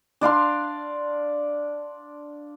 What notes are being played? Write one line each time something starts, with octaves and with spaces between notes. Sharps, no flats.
D4 D5 F5 C6